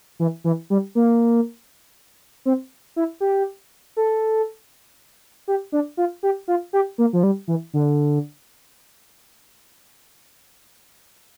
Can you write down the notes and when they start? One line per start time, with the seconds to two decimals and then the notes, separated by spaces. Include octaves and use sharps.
0.20 E3
0.44 E3
0.70 G3
0.95 A#3
2.45 C4
2.96 E4
3.20 G4
3.97 A4
5.48 G4
5.72 D4
5.97 F4
6.23 G4
6.48 F4
6.73 G4
6.98 A#3
7.13 F3
7.23 G3
7.48 E3
7.74 D3